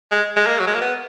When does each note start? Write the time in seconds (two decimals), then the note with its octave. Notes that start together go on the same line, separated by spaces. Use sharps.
0.11 G#3
0.36 G#3
0.46 A#3
0.59 F#3
0.67 G#3
0.75 A#3
0.81 B3